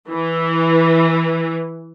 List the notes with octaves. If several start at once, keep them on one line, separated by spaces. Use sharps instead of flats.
E3